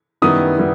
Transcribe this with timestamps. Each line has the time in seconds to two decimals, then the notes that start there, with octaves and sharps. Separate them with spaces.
0.22 F#2 D#3 G3 B3 E4 D#6
0.58 D#3 G3 B3 E4